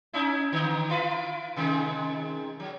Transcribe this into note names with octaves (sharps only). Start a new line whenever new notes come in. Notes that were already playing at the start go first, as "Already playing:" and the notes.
C#4 D#4 E4
D3
E4 F4 B4
C3 D#3 G#3
F#3